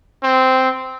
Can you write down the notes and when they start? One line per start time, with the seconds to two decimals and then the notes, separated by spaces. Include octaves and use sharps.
0.23 C4